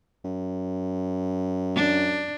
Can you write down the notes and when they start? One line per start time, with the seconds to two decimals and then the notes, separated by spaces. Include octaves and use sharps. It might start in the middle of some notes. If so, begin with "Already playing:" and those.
0.25 F#2
1.76 D4